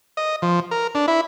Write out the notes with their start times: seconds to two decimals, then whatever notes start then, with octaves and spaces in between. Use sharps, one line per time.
0.17 D#5
0.42 F3
0.71 A#4
0.95 D4
1.08 E4